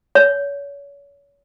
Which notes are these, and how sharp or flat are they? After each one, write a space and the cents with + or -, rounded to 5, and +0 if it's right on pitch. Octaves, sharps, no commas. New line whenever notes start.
C#5 +35